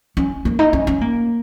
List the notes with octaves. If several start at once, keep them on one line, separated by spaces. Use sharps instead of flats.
C#4
A#3
D#4
C#4
C#4
A#3